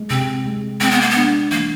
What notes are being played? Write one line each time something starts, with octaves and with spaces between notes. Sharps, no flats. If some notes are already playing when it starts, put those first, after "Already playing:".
Already playing: G#3
C3 C4
G#3
G#3 C4
B3
A#3
B3
D4
E3 A#3